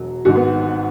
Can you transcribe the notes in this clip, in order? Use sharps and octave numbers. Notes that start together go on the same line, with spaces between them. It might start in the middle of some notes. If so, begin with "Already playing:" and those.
Already playing: E1 F#3
G#1 G#2 D#3 F#4
B3